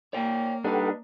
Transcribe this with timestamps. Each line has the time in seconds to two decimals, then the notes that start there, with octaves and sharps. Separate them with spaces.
0.13 A#3 C#5 D5 G5
0.64 G3 D4 D#4 A4 B4 F#5 G5